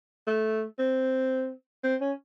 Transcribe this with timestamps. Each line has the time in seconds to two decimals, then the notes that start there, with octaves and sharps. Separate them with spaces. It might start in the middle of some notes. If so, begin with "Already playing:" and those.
0.27 A3
0.79 C4
1.84 C4
2.01 C#4